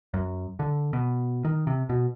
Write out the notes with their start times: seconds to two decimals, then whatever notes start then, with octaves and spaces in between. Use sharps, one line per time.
0.14 F#2
0.59 D3
0.93 B2
1.45 D#3
1.67 C3
1.89 B2